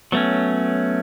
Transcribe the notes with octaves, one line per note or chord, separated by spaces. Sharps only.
F#3 A3 B3 C#4